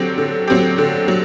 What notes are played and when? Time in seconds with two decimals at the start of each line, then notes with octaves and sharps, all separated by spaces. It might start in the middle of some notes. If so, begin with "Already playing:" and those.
Already playing: D3 F#3 C4 G4
0.18 D3
0.47 F#3 C4 G4
0.78 D3
1.08 F#3